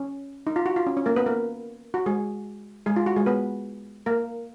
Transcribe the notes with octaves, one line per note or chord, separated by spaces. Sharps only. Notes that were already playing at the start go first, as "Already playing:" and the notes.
Already playing: C#4
D#4
F4
F#4
F4
C#4
C#4
A#3 A#4
B3 B4
A#3 A#4
F#4
G#3 G#4
G#3 G#4
F4
F#4
G#3 G#4
B3 B4
A#3 A#4